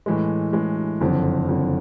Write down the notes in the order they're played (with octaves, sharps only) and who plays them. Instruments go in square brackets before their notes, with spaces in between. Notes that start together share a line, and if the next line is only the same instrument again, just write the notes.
[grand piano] A2 E3 G#3
A2 E3 G#3
F#1 F2 D3
F#1 F2 D3